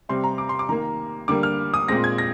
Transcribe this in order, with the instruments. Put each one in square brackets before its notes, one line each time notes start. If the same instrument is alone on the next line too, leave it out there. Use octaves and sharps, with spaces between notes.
[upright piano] C3 G3 C4 C6
A#5
D6
C6
D6
D#3 A#3 A#5
D3 G3 A#3 D6
F6
D#6
A#2 G#3 C4 A#6
G#6
A#6